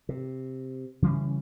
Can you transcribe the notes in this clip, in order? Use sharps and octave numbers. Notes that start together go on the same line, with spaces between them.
C3
C#3 E3 G3 C#4